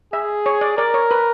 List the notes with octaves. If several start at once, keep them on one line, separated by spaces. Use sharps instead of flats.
G#4 E5
C#5
D5
A#4 D5
C#5
B4